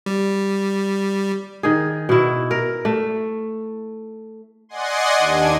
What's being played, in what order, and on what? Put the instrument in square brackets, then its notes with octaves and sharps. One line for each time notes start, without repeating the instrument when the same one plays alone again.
[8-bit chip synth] G3
[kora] D#3 G#4
B2 E4
A#4
A3
[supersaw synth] D5 D#5 F#5 G#5 C6
D#2 D4 G#6